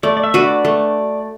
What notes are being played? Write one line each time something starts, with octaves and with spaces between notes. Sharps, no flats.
A3 D5
D5
E5
D4 F#4 B4
D5
A3